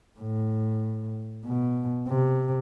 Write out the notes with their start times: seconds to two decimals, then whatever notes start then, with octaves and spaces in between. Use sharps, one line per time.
0.20 A2
1.45 B2
2.08 C3